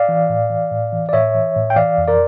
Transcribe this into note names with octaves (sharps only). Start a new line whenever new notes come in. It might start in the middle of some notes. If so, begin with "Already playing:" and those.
Already playing: D5 F5
E3
A2
E3
A2
E3
D5
A2 C#5 E5
E3
A2
G5
E3 D5 F5
F2
A#4 D5